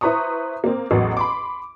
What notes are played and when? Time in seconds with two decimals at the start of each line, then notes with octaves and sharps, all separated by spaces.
0.01 E4 B4 C5 A#5 C#6 D#6
0.64 A#3 C4
0.91 A1 E2 F#3
1.17 B5 C6 D6